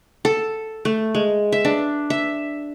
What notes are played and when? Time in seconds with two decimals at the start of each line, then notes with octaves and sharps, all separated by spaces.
0.25 A4
0.85 A3
1.15 G#3
1.52 E5
1.65 D4
2.10 E5